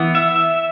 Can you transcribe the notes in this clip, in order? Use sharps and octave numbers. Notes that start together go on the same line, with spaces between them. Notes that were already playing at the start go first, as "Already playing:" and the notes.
Already playing: E3 B3
E5